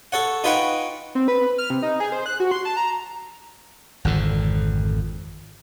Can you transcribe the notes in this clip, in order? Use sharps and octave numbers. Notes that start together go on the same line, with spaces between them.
A4 C#5 F#5
D#4 F4 B4 C#5 F#5 G5
C4
B4
F6
C3
D#4
G#4
C5
F#6
F#4
C6
A5
A#5
G#1 F2 D3